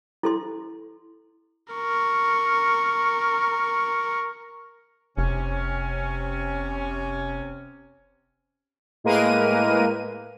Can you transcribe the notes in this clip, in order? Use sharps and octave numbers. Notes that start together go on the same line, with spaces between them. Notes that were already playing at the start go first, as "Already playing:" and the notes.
E4 A4 C6
A#4 C#6
F1 C3 C#4
A2 G#3 A#3 A#4 B4 D#7